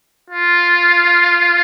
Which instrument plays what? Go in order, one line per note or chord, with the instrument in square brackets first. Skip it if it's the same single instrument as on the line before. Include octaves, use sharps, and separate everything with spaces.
[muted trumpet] F4